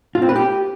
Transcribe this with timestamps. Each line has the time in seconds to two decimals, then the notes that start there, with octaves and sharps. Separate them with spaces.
0.15 F4
0.22 C4
0.29 B4
0.36 G4